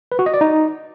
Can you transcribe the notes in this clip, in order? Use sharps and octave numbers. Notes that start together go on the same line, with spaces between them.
B4
F#4
D#5
D5
D#4